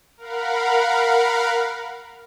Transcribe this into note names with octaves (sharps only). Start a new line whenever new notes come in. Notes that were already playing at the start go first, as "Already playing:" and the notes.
A#4 F5 F#5 B5